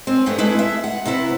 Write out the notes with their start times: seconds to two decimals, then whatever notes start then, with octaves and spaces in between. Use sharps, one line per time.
0.07 C4 C#4
0.26 G2 E3 A3 B3
0.38 G#3 A3 E4 B4
0.59 E5
0.84 F#5
1.05 C3 B3 E4